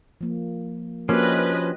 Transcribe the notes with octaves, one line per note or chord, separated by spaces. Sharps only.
F3 A#3
F3 A#3 C#4 D4 F#4 G4 B4 D#5